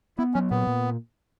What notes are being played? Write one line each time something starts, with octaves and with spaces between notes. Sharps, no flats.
B3 E4
F#3 C#4
A#2 B3
A#2